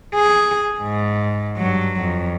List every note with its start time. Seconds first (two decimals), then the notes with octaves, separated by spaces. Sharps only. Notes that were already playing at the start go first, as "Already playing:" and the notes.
0.15 G#4
0.81 G#2
1.57 G2 F#3
2.00 F2